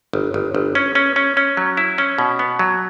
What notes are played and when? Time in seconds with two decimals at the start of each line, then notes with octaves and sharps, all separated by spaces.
0.13 G1
0.34 G1
0.55 G1
0.75 C#4
0.95 C#4
1.16 C#4
1.37 C#4
1.57 F#3
1.77 E4
1.98 C#4
2.18 B2
2.39 B3
2.59 F#3